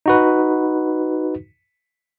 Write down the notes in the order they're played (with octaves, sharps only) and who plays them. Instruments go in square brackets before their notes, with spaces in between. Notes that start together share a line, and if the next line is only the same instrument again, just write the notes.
[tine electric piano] D#4 F#4 B4